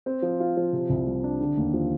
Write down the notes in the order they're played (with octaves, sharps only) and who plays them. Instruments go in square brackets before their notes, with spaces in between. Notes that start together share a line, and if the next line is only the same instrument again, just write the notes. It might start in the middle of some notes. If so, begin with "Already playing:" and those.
[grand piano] C4
F3
F4
F3
C3
C2
G3
D4
D3
D#2
F3